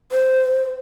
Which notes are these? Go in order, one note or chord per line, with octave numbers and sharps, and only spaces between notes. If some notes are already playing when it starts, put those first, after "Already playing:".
C5